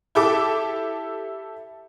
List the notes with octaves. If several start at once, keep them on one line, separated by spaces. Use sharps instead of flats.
E4 G4 A4 D6